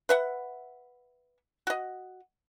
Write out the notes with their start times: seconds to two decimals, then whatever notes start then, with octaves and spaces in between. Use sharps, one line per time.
0.09 B4 E5 F#5
1.67 F#4 D#5